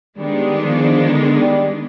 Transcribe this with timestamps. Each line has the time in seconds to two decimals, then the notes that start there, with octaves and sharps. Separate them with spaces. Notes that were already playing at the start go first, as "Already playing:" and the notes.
0.17 D#3 G3 G#3 B3 D4
0.64 F3
1.09 D3
1.39 G3